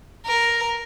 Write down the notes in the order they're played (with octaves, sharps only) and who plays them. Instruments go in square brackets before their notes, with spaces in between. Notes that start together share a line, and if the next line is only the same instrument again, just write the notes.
[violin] A#4